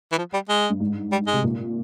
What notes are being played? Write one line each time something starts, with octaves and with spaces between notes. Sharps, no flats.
E3
F3
G3
G#3
G2
G#2
G3
G#3
C3
A#2